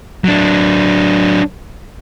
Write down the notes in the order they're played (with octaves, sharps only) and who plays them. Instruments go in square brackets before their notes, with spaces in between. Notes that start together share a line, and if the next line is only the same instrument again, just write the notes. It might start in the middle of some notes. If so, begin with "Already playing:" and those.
[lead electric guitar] F#3 D4